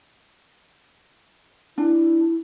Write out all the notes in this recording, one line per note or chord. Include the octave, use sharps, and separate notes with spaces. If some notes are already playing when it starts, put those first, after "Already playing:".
D4 E4